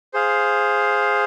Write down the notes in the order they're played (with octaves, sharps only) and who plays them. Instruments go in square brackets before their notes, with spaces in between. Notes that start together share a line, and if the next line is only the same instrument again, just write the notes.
[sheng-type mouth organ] G#4 C5 F5